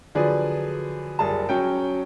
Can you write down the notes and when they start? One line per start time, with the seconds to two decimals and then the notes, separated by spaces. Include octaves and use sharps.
0.15 D3 F3 F#3 G#4 B4 D5
1.19 F#1 G3 G#4 A5
1.49 F#3 C#4 G5